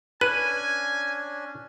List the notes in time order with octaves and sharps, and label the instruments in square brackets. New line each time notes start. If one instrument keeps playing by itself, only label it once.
[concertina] C#4 D4 [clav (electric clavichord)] B4 [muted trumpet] G#5 [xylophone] D#7